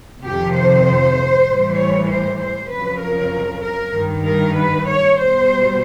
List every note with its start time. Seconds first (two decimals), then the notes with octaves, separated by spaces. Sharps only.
0.24 F2 C3 D#3 G4
0.55 C5
1.47 A2 E3 G3
1.78 C#5
2.09 C5
2.39 C5
2.69 F2 C#3 F#3 B4
3.01 A#4
3.62 A#4
3.93 G2 D#3 G3
4.24 A#4
4.54 B4
4.86 C#5
5.16 B2 G3 C5